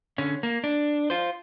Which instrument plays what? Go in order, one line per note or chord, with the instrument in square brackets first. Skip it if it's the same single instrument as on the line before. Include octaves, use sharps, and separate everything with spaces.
[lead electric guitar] D3 C#4
A#3
D4
F4 C5